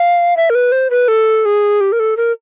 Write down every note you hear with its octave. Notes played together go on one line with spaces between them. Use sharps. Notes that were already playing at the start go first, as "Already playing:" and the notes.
Already playing: F5
E5
A#4
B4
C5
B4
A4
G#4
G4
A#4
A4
A#4